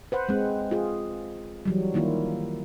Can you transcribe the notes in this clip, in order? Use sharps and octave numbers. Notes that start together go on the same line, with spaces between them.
B4 C5 F#5
G#3 C4
F4 G#4
E3 F#3 G3
D#3 A#3 E4 F4